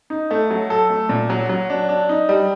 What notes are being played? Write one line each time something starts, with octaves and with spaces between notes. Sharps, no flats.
D#4
A3
F#3
A4
A3
A#2
F#3
F#3
D4
D4
D#4
G3